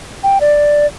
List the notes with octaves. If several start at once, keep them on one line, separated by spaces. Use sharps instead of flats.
G5
D5